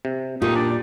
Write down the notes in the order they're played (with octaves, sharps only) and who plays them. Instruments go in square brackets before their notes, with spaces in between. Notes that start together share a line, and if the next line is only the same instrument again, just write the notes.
[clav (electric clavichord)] C3
[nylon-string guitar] A#2 [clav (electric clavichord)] A3 [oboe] D#4 [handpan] F4 G4
[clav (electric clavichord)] D4 [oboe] D5